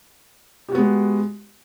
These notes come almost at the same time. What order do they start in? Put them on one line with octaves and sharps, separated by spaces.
G4 F#4 B3 G#3